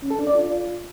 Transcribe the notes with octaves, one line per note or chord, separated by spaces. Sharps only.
C#4
A4
D4
D5
F4